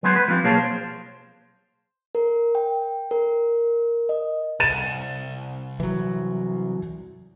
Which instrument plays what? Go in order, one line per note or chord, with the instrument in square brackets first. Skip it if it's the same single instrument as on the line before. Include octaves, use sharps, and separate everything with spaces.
[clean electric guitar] F#3 G#3 B3 G#4 C5
B4
F3 C4 F4 G4
B1 A#3 G#4 C#5 F5 A5
C5
[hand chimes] A#4
G5
A#4
D#5
[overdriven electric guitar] C2 [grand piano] A6 D#7 E7
[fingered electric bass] E3 F#3